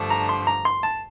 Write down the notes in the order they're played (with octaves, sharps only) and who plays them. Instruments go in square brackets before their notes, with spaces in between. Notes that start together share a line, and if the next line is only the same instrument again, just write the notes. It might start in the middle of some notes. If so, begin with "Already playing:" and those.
Already playing: [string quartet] G2 D3 F3 A3
[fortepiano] A#5
C6
A#5
C6
A5